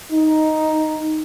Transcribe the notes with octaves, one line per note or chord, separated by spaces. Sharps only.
D#4